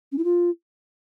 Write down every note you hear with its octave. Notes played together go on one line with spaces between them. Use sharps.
C#4
E4
F4